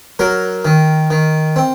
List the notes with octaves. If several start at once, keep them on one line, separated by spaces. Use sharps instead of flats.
F#3 A#4
D#3
D#3
C4